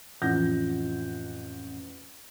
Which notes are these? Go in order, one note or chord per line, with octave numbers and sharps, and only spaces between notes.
A1 F2 F#5 G6 A#6